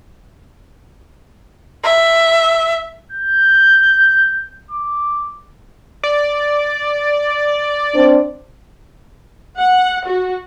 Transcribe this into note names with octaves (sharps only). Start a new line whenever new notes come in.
E5
G6
D6
D5
C4 D4 C5
F#5
F#4